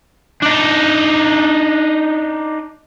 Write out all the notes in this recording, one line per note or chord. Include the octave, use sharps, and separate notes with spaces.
D4 D#4